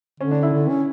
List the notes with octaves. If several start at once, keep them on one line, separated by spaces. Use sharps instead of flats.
D3 C#4
D4
E4
D3
C#4